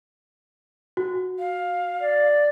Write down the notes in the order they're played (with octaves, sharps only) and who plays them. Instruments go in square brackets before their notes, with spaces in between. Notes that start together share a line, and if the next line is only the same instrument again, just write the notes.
[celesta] F#4
[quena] F5
[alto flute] D5